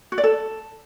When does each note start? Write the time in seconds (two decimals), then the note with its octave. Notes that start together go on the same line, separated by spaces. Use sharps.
0.12 F#4
0.18 D5
0.24 A4